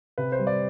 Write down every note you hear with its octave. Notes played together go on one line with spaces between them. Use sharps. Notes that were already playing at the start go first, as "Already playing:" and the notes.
C3 B4
C5
G3
D5